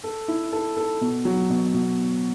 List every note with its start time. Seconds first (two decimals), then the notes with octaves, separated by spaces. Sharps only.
0.04 A4
0.28 E4
0.52 A4
0.77 A4
1.01 B2
1.25 F#3
1.50 B2
1.74 B2